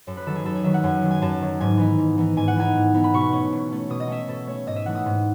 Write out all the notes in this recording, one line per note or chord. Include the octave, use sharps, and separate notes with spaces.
F#2 A4
B4
D#3 F#3 A4
G#4
F#2 A4
G#4
D#3 F#3 E5
F#5
F#2 G#5
D#3 F#3
G#5
F#2 A5
D#3 F#3
G#2 G#5
E3 B3 D#4
G#2
E3 B3 D#4
G#2 G#5
F#5
E3 B3 D#4 G#5
G#2
E3 B3 D#4
B5
B2 C#6
A3 C#4
B2
A3 C#4
B2 D#6
D#5
A3 C#4 E5
B2 A4
A3 C#4 C#5
G#2 D#5
E5
E3 A3 F#5
D#6
G#2